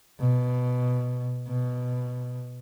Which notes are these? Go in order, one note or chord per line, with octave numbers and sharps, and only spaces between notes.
B2
B2